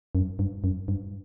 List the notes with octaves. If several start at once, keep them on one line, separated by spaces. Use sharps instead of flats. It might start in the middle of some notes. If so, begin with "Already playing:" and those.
F#2
G2
F#2
G2